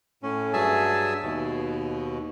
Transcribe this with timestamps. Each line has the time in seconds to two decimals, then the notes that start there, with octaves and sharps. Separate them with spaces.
0.23 A2 C#4
0.53 G2 F#3 G#4 E5 G#5 A5
1.22 D#2 B2